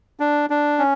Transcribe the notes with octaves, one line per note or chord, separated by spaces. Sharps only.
D4
D4
C#4